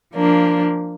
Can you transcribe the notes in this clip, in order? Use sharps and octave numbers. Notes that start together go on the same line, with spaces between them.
F3 A#3 D4